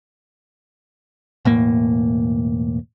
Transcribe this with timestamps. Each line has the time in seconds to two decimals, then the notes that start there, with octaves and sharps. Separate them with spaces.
1.45 E1 A2 A#3